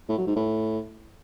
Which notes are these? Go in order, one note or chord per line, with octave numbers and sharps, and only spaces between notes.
A2
F#3
G#2
A2